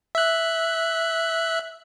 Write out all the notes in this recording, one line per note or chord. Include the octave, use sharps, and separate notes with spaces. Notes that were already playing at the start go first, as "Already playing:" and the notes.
E5 F#6